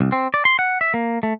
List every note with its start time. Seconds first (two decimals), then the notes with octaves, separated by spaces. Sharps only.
0.01 C2
0.12 C4
0.34 D5
0.45 C6
0.59 F#5
0.81 E5
0.94 A#3
1.23 A3